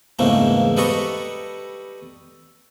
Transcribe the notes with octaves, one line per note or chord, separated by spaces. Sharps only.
E2 G#2 C#3 E3 A3 A#3
G3 A4 B4 D#5 A#5 C#6